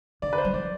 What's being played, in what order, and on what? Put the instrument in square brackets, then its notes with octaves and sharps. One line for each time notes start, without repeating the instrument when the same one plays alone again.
[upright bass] D3 [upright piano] D5
[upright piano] B4
C5
[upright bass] G3
[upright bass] F3 [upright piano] D5